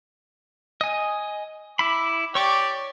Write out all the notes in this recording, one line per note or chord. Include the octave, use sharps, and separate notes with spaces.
D#5 G#5
E4 B5 D6
G4 C#5 D5 C#6 D6